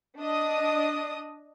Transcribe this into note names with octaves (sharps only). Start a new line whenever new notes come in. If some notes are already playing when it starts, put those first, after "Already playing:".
D4 D#5 D#6